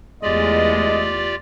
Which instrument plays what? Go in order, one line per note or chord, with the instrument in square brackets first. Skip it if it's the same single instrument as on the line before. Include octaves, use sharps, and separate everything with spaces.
[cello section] E2 A3 [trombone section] G#3 [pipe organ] F4 G4 D5 [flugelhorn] D#5